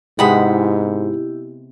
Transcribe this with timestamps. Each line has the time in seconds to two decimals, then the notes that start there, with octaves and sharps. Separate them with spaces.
0.19 G#2 C3 G#3 B3 E4 G4 F#5 B5